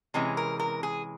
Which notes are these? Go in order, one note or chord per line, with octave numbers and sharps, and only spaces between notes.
C3 E3 G#3 C#4
A#4
A#4
G#4